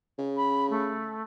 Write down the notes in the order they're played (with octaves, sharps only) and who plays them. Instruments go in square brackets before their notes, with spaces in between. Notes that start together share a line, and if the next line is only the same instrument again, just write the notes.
[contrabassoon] C#3
[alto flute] B5
A3